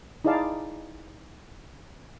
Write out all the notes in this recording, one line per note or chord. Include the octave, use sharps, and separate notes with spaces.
D#4 E4 G#4 D5 F5 A5